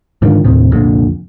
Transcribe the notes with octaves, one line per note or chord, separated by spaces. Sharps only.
G#2 D3 D#3 F3
D#2 A2 C3
C2 F2 A#2 D3